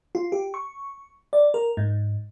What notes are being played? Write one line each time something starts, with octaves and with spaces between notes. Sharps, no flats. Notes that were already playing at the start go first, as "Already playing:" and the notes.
F4
G4
C#6
D5
A#4
G#2